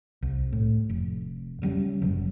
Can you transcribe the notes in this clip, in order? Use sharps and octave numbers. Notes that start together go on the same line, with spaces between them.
C2
A2
F1
C#3 F#3 G3 C#4
F#1 C#3 F#3